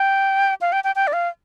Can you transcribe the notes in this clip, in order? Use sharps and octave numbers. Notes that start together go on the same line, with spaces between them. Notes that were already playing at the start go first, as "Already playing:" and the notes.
Already playing: G5
F5
G5
G5
G5
D5
F5